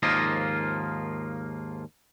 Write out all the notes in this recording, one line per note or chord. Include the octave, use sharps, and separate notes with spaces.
D#2 G#2 F3 A#3 F4 D#5